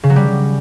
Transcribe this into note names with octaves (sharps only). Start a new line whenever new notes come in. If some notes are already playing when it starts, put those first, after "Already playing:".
C#3
F#3
G3